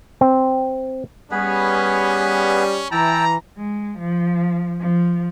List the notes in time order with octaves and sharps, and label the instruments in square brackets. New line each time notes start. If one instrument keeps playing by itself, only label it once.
[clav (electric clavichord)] C4
[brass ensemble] G3 C#4 [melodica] B3 G#4 B4
[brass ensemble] E3 A#5 [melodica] E4 G5 A5
[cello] G#3
F3
F3